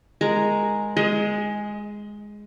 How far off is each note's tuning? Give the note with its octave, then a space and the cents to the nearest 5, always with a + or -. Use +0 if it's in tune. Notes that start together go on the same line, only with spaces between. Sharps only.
G#3 +0 A#4 +0
G#3 +0 D#5 +30